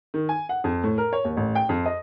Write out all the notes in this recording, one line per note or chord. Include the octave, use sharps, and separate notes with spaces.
D#3
G#5
F#5
F2
A2
A#4
C#5
D#2
A1
G5
F2
D#5